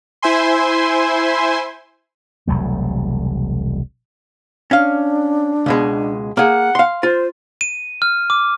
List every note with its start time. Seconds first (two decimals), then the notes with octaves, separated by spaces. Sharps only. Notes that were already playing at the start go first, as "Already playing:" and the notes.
0.22 E4 C5 E5 G#5 C6
2.48 E1 C2 F#3 A3
4.71 C#4 D4 F5
5.66 C#2 B2 G#3
6.37 A#3 G#4 F#5
6.75 F5 C6
7.03 F4 C5
7.61 D#7
8.02 F6
8.30 D6